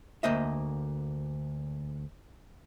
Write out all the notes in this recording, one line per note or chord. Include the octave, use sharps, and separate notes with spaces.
D2 A#3 C5 D#5 E5